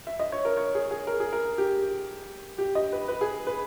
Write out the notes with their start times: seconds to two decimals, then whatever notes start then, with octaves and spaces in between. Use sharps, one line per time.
0.07 E5
0.19 D#5
0.32 C#5
0.45 A#4
0.57 C#5
0.75 G#4
0.91 G#4
1.07 A#4
1.20 G#4
1.33 A#4
1.58 G4
2.58 G4
2.75 D#5
2.92 B4
3.08 B4
3.21 G#4
3.47 B4